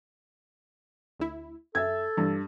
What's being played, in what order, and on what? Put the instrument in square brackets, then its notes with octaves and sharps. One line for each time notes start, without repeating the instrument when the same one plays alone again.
[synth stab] D2 E4
[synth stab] F#2 [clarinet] A4 [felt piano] E5 G#6
[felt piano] G2 [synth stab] E3